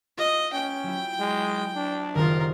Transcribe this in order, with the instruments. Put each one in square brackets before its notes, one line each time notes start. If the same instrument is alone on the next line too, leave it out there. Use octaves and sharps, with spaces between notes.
[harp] F4 [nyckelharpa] D#5
[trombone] C#4 [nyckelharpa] G5
[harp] F#3 E4
[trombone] G#3
D4
[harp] F#1 C2 D#3 [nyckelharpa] F4 A#4